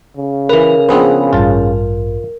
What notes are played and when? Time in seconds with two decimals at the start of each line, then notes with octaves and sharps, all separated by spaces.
0.17 C#3
0.49 E3 A#4 B4
0.89 F3 B3 C4 D4 G#4 B4
1.33 A1 G2 F4 A5